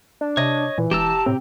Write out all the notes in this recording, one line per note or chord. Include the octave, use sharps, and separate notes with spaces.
D4
C3 C#5 D#5
A#2 E3
E1 G4 A5 A#5 E6
A2 C3 C4